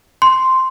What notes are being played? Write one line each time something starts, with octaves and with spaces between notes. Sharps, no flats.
C6